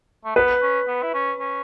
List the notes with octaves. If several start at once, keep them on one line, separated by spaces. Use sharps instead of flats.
A3
B3 B4
C#4
B3
E4
C#4
C#4